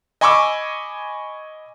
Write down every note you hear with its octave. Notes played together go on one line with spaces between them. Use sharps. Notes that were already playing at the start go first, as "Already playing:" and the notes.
D#5 G#5 B5 C#6 D6 E6